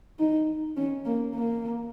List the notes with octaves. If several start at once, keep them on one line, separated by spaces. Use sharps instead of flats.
D#4
C#4
A#3
A#3